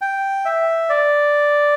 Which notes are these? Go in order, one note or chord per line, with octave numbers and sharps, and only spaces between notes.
G5
E5
D5